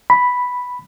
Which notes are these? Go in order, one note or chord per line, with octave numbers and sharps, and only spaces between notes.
B5